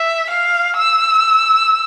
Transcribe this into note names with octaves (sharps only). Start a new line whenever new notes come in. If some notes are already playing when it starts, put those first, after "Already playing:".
Already playing: E5
F5
E6